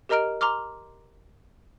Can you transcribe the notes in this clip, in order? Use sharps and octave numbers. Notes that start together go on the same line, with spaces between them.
G4 A#4 D#5 A#5 F6 D7
A#5 C6 D6 F6